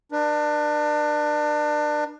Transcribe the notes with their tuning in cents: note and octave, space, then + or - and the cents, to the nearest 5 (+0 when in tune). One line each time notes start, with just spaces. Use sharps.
D4 +30 B4 -40